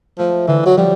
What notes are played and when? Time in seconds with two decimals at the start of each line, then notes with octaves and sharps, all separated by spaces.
0.18 F3 A3
0.47 D3 E3
0.66 F#3
0.77 F3 G3